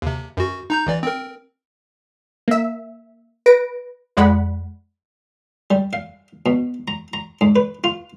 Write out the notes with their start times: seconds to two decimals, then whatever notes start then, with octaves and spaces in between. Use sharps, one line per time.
0.02 D#2 C3
0.37 F#2 F#4
0.70 D#4 A#5 G6
0.87 A1 E3 D5
1.03 C4 A#4
2.48 A#3 E5
3.46 B4 A#6 D7
4.17 F2 G#3 D5 F#5 B5
5.71 G3
5.93 F5
6.46 B2
6.88 A#5
7.13 A#5
7.41 G#2
7.56 B4
7.84 F4